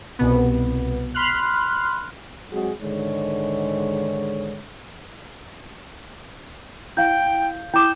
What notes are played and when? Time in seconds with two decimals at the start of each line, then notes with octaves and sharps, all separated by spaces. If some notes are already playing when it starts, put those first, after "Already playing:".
0.19 C2 B2 B3
1.15 B5 C6 F6 F#6
2.52 F#3 G#3 C4 F#4 G#4
2.81 G#2 D3 D#3 G#3 C#5
6.97 E4 F5 G5 G6
7.74 E4 G5 D6 D#6 G6 E7